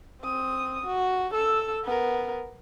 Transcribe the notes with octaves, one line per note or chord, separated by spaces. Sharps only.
C4 D#6
F#4
A4 E6
B3 A#4